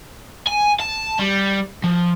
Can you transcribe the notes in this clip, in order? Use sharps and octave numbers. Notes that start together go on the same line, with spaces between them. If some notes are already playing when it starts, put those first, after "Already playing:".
G#5
A5
G3
F3